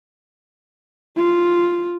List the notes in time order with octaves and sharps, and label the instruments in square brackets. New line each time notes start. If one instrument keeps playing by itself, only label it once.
[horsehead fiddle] F4